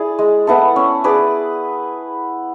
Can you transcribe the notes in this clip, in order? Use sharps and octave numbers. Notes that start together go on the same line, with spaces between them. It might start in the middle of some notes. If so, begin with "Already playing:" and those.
Already playing: E4 G#4 D5
G#3
B3 E4 A4
C#4
G#4 B4 D5